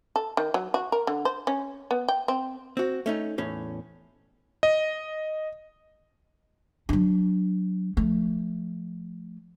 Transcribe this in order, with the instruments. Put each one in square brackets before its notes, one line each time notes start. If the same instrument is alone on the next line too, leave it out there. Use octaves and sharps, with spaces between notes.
[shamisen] A4
D#3
F#3
F#4
A#4
D3
C5
C#4
B3
G5
C4
[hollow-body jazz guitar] C4 F#4
A3 C#4 D#4
E2 A2 C#4
[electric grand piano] D#5
[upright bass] F#3 D4
F3 A3